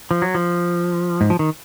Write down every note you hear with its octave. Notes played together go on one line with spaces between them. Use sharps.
F3
F#3
F3
G#2
F3
D#3